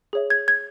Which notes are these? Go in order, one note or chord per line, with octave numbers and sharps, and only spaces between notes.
G#4 C#5 E5
G#6
G#6